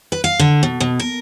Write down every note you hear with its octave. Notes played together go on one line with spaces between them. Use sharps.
B4
F5
D3
B2
B2
A#4